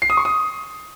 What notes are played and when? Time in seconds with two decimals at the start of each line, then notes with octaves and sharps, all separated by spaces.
0.02 C7
0.10 D#6
0.17 C#6
0.25 D#6